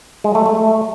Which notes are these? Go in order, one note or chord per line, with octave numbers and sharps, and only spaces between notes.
G#3
A3
A3